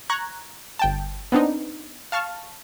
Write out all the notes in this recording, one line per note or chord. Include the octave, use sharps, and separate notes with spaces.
A#5 C#6 F#6 G#6
G1 G5 A5
B3 C4 D4 D#4
F5 A5 C#6 F6